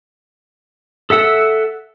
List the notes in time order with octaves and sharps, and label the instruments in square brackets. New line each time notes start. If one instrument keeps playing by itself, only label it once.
[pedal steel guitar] A4 E5 F#5 E6